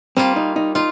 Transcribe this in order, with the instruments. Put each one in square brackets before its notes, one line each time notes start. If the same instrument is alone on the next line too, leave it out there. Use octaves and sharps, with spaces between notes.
[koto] G3 A#3 F4 [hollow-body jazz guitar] C4
[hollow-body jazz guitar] D#4
D#4
[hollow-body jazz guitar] D#4 [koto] F4